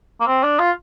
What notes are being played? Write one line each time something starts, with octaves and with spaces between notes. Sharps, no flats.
A#3
C4
D4
F4